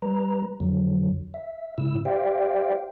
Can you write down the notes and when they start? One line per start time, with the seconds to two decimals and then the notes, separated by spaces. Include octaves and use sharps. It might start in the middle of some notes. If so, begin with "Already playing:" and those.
0.02 G3 B4 A#5
0.60 F2 D3 F#3
1.34 E5
1.78 G#2 C#3 E4 E6
2.05 G4 C5 D5 E5 F5 G5